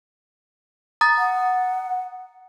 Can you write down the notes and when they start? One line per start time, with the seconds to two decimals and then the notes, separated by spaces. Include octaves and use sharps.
1.01 A#5 D#6 A6
1.18 F#5